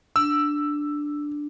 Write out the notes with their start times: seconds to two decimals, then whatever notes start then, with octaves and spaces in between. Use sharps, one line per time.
0.16 D4 E6